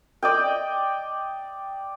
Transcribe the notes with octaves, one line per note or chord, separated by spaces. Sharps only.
D5 D#5 G5